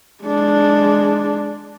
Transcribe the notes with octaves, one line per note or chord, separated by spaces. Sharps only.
G#3 D4